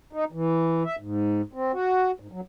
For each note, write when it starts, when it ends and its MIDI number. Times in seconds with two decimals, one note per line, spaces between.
0.13 0.25 63
0.32 0.83 52
0.85 0.96 76
0.99 1.42 44
1.53 1.72 60
1.72 2.11 66
2.20 2.27 44
2.32 2.41 54